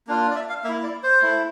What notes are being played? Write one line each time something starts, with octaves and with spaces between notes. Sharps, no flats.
A#3 D4 F4
D5
E5
F5
A#3 E4 E5
D5
C5
A3 E4